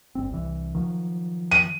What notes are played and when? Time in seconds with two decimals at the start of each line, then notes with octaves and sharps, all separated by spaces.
0.15 G1 C4
0.30 C2 E3
0.75 D#3 F3 F#3
1.51 D#7